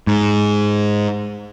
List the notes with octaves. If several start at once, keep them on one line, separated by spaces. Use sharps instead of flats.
G#2